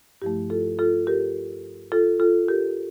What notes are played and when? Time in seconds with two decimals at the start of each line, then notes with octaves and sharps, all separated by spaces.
0.22 G2 F3 A3 E4 G4
0.50 F4 A4
0.79 F4 A4
1.07 G4 A#4
1.92 F4 A4
2.20 F4 A4
2.48 G4 A#4